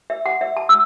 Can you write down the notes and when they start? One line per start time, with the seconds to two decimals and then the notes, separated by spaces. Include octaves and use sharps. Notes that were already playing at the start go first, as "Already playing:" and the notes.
0.10 E5
0.26 F#5
0.41 E5
0.57 A5
0.69 E6